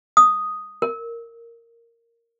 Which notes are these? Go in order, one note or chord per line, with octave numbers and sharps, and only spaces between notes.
D#6
A#4